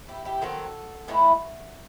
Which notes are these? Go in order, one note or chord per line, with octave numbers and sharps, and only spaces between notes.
E4 G4
E4 G4
D#3 F#3 C4 F#4 A4
A2 E3 A3 E4